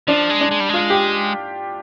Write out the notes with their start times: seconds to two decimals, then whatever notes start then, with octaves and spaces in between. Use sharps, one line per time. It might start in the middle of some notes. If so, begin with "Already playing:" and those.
0.08 F3 D4
0.30 G#3
0.41 D4
0.51 G#3
0.60 G3
0.69 G#3 F4
0.90 G4